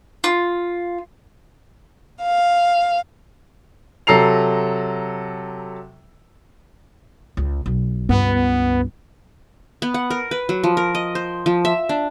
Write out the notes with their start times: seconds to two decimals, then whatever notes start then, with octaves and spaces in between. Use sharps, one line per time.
0.24 F4
2.20 F5
4.07 C3 F#3 A4 A#5 C7 F7
7.37 C#2
7.66 B1
8.09 C#2 G2 B3
9.82 B3
9.94 F#5
10.10 A#4
10.31 B4
10.49 F#3
10.64 F3
10.77 A#4
10.95 D#5
11.15 C5
11.46 F3
11.65 E5
11.89 D4